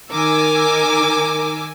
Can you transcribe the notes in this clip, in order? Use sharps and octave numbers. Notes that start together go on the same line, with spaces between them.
D#3 A#4 G#5 D6 E6